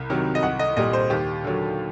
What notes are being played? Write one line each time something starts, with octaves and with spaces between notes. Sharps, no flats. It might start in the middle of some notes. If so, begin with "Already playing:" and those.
Already playing: C2
C3 D#3 F#3
D#5
C2 F#5
D#5
A#2 G3 D#5
C5
D#2 G4
D3 F#3